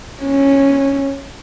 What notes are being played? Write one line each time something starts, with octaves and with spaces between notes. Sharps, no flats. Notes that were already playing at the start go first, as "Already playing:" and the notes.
C#4